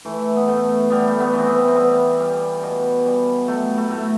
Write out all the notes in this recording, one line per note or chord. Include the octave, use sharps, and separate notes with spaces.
E3 A3
B3
A2 A3
G3 B3
A3
B3
E3
C4
B3
C4
G3 B3
G3
B2
G3
F#3 A3
A3
A2